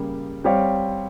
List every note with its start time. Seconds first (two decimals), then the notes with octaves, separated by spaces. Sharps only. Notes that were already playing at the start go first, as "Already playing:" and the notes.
Already playing: C#3 G3 A#3
0.44 G3 C4 G4 C#5 F5